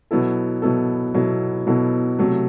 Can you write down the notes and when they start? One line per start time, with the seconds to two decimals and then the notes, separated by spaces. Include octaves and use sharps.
0.11 B2 F#3 B3 E4 A4
0.62 B2 F#3 B3 E4 A4
1.14 B2 F#3 B3 E4 A4
1.67 B2 F#3 B3 E4 A4
2.19 C3 F#3 A3